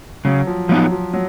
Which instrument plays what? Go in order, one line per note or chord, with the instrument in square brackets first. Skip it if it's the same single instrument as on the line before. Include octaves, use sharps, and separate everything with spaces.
[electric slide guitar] C#3 [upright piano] F#3
[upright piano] F3
[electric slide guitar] F3 B3 D#4 [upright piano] F#3
[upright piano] F3
F#3